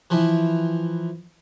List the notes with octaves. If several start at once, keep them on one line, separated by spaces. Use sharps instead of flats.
E3 F3 E4